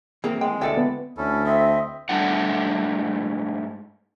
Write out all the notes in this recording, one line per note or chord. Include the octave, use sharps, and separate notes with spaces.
E3 A#3 C4 G#4
G#3 G5
D2 E3 A4 D5 E5 G5
B3
D2 C#4 E4 A4
C4 D#5 E5
G#2 G3 A3 D4 F#5